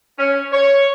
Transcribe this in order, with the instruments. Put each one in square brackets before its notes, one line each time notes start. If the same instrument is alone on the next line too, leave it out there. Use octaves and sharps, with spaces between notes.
[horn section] C#4
C#5